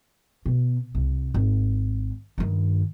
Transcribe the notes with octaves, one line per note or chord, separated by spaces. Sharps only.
B2
C2
G#1
G2 D#3